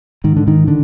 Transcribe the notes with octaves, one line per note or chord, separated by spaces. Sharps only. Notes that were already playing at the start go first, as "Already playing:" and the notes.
G#2 D#3
D3
D#3
D3